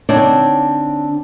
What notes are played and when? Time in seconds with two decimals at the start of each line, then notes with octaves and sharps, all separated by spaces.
0.09 D3 C4 D4 D#4 C#5 D5